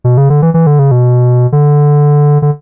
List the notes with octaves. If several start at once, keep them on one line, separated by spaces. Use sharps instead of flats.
B2
C#3
D3
E3
E3
D3
C#3
B2
D3
D3